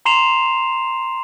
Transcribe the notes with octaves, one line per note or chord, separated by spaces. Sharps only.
A#5 C6 C7 E7 F7